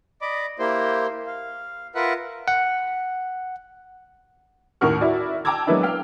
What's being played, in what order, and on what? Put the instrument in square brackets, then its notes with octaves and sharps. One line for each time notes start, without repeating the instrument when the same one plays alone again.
[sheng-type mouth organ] D5 D#5 B5 D6
A#3 E4 G4 C5
F5
F4 A#4 B4 E5 F#5
[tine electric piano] F#5
[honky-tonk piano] D#2 A2 A#4 F#5 C#6 F6
E4 F#4 D5
G5 A5 A#5 D6 E6 G#6
F#3 G#3 A#3 B3 D4 E4
F5 G5 F6